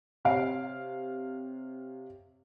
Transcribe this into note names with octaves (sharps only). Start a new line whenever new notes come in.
C3 C#5 F5 C7 D7